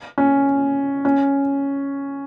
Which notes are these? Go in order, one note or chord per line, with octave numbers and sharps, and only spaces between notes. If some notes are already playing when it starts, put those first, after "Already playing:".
C#4
C#4